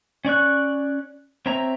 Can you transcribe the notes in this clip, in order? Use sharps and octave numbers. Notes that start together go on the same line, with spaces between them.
C#4 D5 C#6 F#6
C4 C#5 E5 A#5